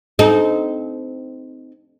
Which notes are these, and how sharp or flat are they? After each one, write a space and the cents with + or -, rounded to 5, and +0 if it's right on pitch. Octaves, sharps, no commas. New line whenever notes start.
C4 -15 D#4 +0 A4 -35